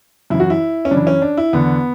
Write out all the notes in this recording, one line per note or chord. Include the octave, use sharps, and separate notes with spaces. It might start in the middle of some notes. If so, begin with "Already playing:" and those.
F#2 E3 E4
F#4
E4
C#4
F#2 D4
E3
C#4
D4
E4
E2 D3 B3